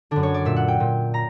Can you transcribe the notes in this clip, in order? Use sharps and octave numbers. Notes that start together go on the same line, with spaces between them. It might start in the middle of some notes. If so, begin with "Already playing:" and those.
F#2 D3 D4
C#5
D5
A#2 E5
F#5
G5
A#2
A#5